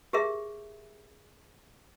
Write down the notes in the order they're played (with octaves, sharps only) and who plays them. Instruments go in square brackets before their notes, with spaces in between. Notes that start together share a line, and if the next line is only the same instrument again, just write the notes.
[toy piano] G4 G#4 A#4 E5